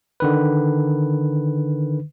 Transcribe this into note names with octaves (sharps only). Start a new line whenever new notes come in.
D3 D#3 B4